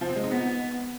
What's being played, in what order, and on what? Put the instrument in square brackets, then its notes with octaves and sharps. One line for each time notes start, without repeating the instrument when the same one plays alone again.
[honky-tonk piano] F3
C4
G#3
D#4
B3